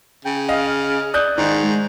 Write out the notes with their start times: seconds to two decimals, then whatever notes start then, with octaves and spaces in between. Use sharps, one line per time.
0.25 C#3 G5
0.49 D#5 F5 F6
1.14 D5 D#6 F#6 G6
1.38 G#2 D#3
1.63 G#3